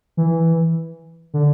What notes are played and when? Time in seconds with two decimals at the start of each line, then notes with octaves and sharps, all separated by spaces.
0.17 E3
1.34 D3